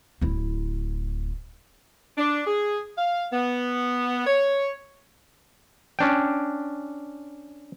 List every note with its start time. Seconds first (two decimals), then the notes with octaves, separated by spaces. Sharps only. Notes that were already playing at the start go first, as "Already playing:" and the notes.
0.21 D1 E4
2.17 D4
2.47 G#4
2.98 F5
3.32 B3
4.27 C#5
5.99 C#4 D4 G5